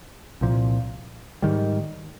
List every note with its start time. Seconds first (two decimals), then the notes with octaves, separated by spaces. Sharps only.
0.41 C2 A#2 F3
1.42 G#2 D#3 G3